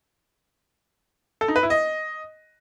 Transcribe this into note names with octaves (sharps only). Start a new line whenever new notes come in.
A4
D#4
B4
E4
D#5